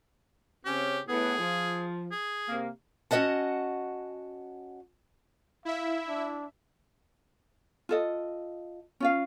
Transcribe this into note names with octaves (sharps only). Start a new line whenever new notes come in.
C#3 C4 C#4 G4
A2 B3 G#4
F3
G#4
C3 A#3
C#4 F#4 A4 D#5 F#5 A5
E4 E5 F5
D4
F4 A4 D#5
C#4 F4 F5